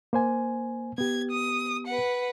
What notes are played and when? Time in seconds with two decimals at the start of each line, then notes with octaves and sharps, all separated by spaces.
0.13 A#3 C5 G#5
0.98 B3 G4 G#6
1.31 D#6
1.87 B4 F#5